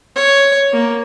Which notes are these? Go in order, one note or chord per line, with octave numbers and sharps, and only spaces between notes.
C#5
A#3